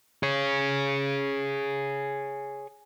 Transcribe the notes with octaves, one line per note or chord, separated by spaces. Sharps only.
G#4 C#5